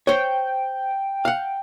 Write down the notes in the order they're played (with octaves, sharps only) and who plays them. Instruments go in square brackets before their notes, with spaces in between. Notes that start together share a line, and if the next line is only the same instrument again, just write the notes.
[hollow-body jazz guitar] C5 C#5 [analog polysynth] G5
[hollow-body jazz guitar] F5 F#5